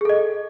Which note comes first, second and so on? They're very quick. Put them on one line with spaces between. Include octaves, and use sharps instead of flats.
G#4 A4 D#5